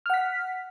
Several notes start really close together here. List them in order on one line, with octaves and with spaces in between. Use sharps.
F6 F#5 B6